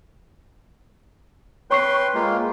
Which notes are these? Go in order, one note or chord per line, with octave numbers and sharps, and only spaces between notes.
B4 C#5 G5 C6 C#6 C7
G#3 A#3 F4